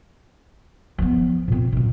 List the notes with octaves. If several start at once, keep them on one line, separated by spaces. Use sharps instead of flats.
F3 B3
A#2 C4
F#2 A#2